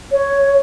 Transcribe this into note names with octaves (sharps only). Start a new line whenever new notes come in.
C#5